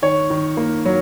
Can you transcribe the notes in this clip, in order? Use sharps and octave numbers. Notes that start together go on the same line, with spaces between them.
D#3 C#5
D#3
A#3
F#3